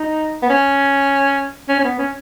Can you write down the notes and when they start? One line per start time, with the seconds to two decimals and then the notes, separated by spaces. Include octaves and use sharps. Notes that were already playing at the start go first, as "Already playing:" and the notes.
Already playing: D#4
0.42 B3
0.50 C#4
1.69 C#4
1.79 C#4
1.84 B3
1.99 C#4